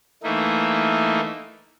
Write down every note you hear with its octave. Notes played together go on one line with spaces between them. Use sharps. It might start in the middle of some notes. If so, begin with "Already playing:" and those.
E3 A3 A#3 D#4 E4